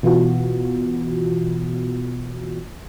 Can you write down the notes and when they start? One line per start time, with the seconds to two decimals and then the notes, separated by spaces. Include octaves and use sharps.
0.03 B2 E3 B3 F4 F#4